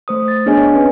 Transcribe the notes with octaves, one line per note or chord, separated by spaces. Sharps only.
A3 C5 D#6
A6
B3 D4 G#4 C#5 D#5 G#5
C4 C#4 B4